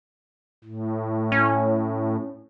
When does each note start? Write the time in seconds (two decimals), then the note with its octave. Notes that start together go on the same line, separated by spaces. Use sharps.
0.64 A2
1.32 C#4